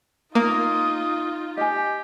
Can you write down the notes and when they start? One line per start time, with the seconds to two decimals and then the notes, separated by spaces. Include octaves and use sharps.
0.35 A#3 D#4 F4 D#6
1.57 G4 D#5 G#5